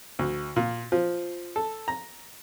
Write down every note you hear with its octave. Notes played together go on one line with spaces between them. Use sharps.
D2
A#2
F3
A4
A#5